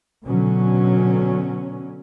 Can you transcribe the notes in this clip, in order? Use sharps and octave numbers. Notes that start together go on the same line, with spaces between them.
B2 D3 F#3 C#4